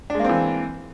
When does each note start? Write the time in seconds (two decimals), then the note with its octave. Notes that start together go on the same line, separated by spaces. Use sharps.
0.10 D4
0.15 G#3
0.20 A#3
0.24 C4
0.29 E3